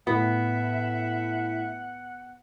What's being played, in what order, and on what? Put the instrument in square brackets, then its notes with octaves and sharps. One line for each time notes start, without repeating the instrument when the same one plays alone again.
[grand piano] A2 [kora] B3 [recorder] E5 [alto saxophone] F#5